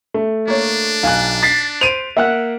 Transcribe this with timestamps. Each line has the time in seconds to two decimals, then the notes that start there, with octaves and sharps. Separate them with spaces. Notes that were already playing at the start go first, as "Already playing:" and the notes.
0.14 A3
0.48 A#3 D4 C#5
1.03 B1 F5 G#5 F#6
1.43 A6 B6 C7
1.81 C5 D7 D#7 F7
2.17 A#3 E5 F#5 F#6